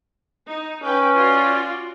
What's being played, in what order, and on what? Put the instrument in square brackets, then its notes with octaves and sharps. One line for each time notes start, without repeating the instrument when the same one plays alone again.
[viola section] D#4
[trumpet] C#4 [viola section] B4 G5
[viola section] F4 F#4 D5